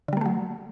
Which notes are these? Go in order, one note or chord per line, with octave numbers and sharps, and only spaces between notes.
D3 F#3 G3 A3 A#3